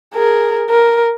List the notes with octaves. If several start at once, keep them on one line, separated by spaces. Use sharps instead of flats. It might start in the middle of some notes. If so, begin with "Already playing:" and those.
G#4 A#4
A#4